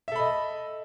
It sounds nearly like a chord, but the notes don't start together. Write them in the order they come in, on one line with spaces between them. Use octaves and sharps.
E5 A4 B5 D#5